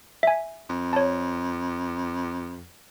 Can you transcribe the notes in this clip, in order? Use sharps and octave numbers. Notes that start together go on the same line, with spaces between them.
E5 G#5
F2
C#5 A5